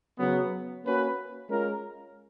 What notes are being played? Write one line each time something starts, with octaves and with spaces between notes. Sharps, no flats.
C#3 F#3 B3
A#3 C#4 F#4 B4
G#3 C#4 F4 A#4